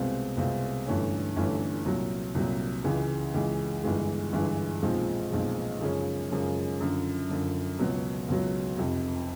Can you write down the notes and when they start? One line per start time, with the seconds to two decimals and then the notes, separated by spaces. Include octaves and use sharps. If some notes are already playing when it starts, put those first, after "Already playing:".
Already playing: C2 B2 G#3 C4 F4
0.37 C2 B2 G#3 C4 F4
0.86 G1 G2 E3 A3 C#4
1.36 G1 G2 E3 A3 C#4
1.85 C2 A#2 F#3
2.35 C2 A#2 F#3
2.84 C#2 C#3 E3 G#3
3.34 C#2 C#3 E3 G#3
3.84 G1 G2 E3 G#3
4.32 G1 G2 E3 G#3
4.82 B1 A#2 F3 G#3 C4
5.32 B1 A#2 F3 G#3 C4
5.81 F#2 C#3 F3 G#3 C#4
6.31 F#2 C#3 F3 G#3 C#4
6.80 F#2 D3 F3
7.30 F#2 D3 F3
7.79 C#2 B2 F#3
8.28 C#2 B2 F#3
8.77 F1 F2 C3